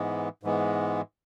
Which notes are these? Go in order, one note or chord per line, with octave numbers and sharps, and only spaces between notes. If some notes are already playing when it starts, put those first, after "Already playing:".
Already playing: G#2 E3 G#3 B3
G#2 E3 G#3 B3